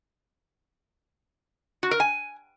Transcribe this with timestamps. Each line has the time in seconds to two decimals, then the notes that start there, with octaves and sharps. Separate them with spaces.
1.83 F#4
1.91 A#4
2.00 G#5